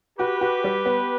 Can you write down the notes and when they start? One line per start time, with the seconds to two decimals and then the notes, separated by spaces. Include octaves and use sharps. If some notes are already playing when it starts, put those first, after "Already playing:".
0.18 F#4 G4 B4
0.41 F#4
0.64 G3
0.86 B3